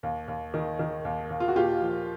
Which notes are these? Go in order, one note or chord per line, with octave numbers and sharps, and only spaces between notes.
D#2
D#2
D#3
D#3
D#2
D#2
F4
F#4
A#2 F4 G4
F3